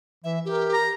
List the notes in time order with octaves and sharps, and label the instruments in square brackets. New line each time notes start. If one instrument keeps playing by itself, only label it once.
[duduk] E3 [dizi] E5
[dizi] G4 [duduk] A#4
[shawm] A#5